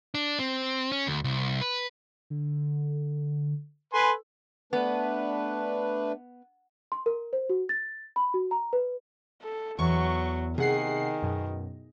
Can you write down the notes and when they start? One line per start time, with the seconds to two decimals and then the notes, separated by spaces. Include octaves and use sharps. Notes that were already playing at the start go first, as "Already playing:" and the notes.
0.14 D4
0.39 C4
0.92 C#4
1.07 D2
1.24 C2
1.61 B4
2.30 D3
3.94 A4 B4 G#5 C6
4.73 A3 B3 D4 B4
6.92 C6
7.06 A#4
7.33 C5
7.49 F#4
7.69 A6
8.16 B5
8.34 F#4
8.51 A#5
8.73 B4
9.42 A4
9.79 E2 F#3 C#6
10.58 C3 D#3 G#4 F#5 C7
11.22 F#2 B2